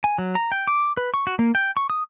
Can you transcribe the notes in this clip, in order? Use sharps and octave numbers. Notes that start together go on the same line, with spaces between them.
G#5
F#3
A#5
G5
D6
B4
C#6
F#4
A#3
G5
C#6
D#6